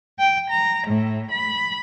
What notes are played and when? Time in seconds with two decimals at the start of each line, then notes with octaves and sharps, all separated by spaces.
0.18 G5
0.49 A#5
0.86 A2
1.31 B5